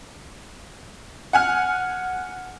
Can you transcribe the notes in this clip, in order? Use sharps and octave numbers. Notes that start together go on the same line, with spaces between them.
F#5 G#5 F6